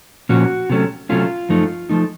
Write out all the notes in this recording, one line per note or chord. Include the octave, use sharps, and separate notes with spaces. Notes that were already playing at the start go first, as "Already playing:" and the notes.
A#2 F3 A#3 C#4 F#4
C3 F#3 A3 C#4
C3 F#3 A3 C#4 F4
F#2 F3 A3 D#4
F3 A3 D#4